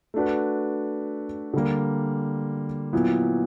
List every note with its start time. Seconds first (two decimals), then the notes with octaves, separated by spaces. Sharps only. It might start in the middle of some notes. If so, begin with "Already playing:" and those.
0.14 A3 D4 F#4 B4
1.54 D3 G3 A#3
2.93 A#2 F#3 B3 E4